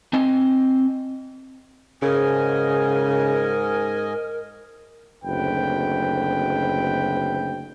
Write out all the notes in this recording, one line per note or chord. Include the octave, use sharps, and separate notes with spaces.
C4 D#5 G#5
G#2 C#3 A#4 D#5 G#5
F#1 D2 C4 B4 G5